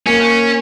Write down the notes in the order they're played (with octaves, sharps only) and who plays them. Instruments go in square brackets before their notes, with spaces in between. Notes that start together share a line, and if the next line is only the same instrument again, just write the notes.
[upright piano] A#3 [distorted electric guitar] C#4